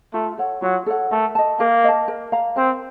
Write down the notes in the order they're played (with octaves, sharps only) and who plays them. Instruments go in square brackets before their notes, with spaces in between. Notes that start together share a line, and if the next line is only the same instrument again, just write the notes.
[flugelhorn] A3 [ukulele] F4
[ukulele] A4 C#5 F#5
[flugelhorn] F#3 [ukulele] F4
[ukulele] A4 C#5 F#5
[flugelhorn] A3 [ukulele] A#4
[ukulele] D#5 A5
[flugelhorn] A#3 [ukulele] A#4
[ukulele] D#5 A5
A#4
F5 A#5
[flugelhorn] C4 [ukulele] A#4